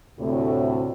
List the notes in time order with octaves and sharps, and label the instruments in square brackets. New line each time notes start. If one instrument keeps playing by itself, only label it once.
[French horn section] D2 A2 C3